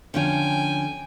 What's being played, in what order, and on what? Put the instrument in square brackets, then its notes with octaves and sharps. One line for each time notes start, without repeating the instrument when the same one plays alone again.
[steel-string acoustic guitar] D3 F3 C#4 [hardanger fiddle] G5 G#5